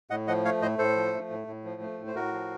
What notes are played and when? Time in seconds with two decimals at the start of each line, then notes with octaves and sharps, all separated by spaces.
0.10 A2 D#5 F#5
0.27 F3 D#5 F#5
0.45 A3 C#5 F5
0.62 A2 C5 D#5
0.78 A2 A4 C5
0.96 F3
1.13 A3
1.30 A2
1.47 A2
1.64 F3
1.82 A3
1.99 A2
2.07 C5
2.15 A2 F#4 A#4
2.33 F3